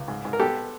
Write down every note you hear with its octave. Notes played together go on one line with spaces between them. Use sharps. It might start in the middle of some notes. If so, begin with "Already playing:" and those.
Already playing: C#2
G#2
G#2
A#4
B3 G4 A4